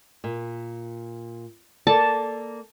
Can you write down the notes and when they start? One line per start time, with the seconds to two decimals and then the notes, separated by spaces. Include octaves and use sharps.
0.24 A#2
1.87 A#3 A4 D5 A5